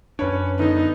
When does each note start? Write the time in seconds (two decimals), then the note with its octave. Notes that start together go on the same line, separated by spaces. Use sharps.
0.19 F#2 C#4 D4 B4 C#5
0.59 D3 B3 D#4